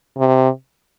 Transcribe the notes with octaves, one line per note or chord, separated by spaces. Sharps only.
C3